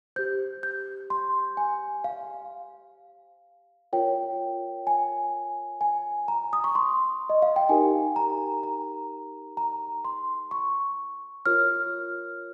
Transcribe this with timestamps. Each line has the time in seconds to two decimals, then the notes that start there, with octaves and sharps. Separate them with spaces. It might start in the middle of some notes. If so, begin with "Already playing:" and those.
0.16 G4 C5 G6
0.63 G6
1.10 C6
1.57 G#5
2.04 F5
3.93 F4 A#4 C#5 G5
4.87 G#5
5.81 G#5
6.28 A#5
6.53 D#6
6.64 C#6
6.75 C6
7.30 D#5
7.42 F5
7.56 G5
7.69 D#4 G4 A#4 G#5
8.16 A#5
8.63 A#5
9.57 A#5
10.05 C6
10.51 C#6
11.46 F4 A#4 C#5 F6